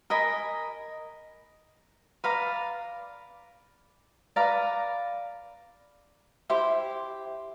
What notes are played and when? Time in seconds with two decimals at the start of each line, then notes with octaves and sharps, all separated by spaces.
0.10 A#4 D#5 G#5 B5
2.24 B4 D5 F5 A#5
4.36 B4 D5 F5 A#5
6.50 E4 G4 C5